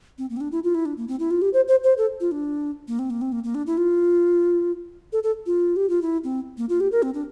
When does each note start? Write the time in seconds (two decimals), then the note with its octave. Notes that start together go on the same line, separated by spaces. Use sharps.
0.18 C4
0.30 A#3
0.37 C4
0.41 D4
0.52 E4
0.64 F4
0.75 E4
0.85 D4
0.97 A#3
1.08 C4
1.19 E4
1.31 F4
1.42 G4
1.53 C5
1.68 C5
1.84 C5
1.98 A4
2.20 F4
2.32 D4
2.88 A#3
2.99 C4
3.10 A#3
3.21 C4
3.32 A#3
3.44 A#3
3.55 D4
3.67 E4
3.77 F4
5.13 A4
5.23 A4
5.46 F4
5.76 G4
5.89 F4
6.02 E4
6.24 C4
6.58 A#3
6.69 F4
6.80 G4
6.92 A#4
7.03 C4
7.14 D4